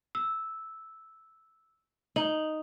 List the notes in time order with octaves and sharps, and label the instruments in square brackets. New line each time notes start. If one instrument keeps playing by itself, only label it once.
[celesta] E6
[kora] D#4 [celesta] F#7